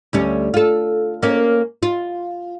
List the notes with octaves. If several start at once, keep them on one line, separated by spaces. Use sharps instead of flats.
D2 G3 C#4
F4 A4
A#3 C#4
F4